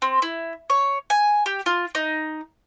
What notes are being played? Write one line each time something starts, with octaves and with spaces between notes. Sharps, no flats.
C4
E4
C#5
G#5
G4
F4
D#4